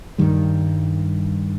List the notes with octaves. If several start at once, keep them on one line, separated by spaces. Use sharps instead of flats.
G2 D#3 G3